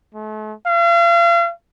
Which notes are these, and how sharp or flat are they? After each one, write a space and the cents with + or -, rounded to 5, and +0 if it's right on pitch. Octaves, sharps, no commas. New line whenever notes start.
A3 -40
F5 -40